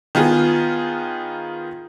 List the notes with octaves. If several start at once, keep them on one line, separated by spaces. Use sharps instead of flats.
D#3 B3 F4 G#4